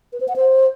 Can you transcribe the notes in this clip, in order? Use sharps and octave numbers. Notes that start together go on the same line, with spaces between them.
B4
C5
F#5
C5